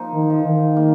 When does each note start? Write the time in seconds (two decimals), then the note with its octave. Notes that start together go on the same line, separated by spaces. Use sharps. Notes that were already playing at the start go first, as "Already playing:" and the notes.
Already playing: F3 A#3 D#4
0.14 D#3
0.30 F3
0.45 D#3
0.76 A#3